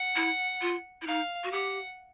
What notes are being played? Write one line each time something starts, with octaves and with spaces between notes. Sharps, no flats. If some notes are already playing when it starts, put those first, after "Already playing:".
Already playing: F#5
E4
F4
E4
D#4 F5
F#4
G4 F#5